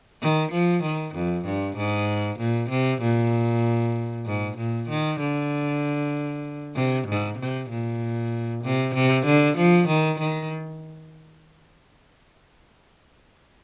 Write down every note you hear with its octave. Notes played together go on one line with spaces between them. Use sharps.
D#3
F3
D#3
F2
G2
G#2
A#2
C3
A#2
G#2
A#2
D#3
D3
C3
G#2
C3
A#2
C3
C3
D3
F3
D#3
D#3